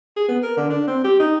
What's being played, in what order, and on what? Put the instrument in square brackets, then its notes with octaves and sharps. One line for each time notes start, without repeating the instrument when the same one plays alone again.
[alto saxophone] G#4
B3
A#4
D3
D4
C4
G4
D#4